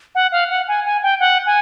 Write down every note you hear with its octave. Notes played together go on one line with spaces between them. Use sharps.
F#5
F5
F#5
G#5
G#5
G5
F#5
G#5